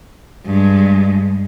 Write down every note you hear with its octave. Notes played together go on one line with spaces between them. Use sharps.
G2 G#3